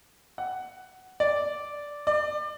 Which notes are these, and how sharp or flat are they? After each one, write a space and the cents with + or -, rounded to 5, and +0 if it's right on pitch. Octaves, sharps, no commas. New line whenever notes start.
F#5 +10
D5 -5
D5 +30